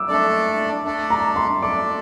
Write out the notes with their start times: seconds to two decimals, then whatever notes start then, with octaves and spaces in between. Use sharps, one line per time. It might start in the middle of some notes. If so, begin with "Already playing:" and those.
Already playing: D6 E6
0.08 A3 D4 A4 D5
0.85 A3 D4 A4 D5
1.10 A#5
1.36 C6
1.62 A3 D4 A4 D5 D6